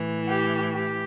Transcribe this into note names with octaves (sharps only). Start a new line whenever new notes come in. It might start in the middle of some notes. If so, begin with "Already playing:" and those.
Already playing: A2 E3
G4
G4